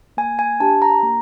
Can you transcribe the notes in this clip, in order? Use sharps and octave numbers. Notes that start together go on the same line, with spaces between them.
A#3 G#5
G#5
D4 G4 A5
A#5
A#3